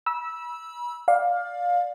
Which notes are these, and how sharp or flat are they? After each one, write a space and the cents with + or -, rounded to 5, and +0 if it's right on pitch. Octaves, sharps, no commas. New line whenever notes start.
B5 -35 E6 -5
D5 +0 F5 +20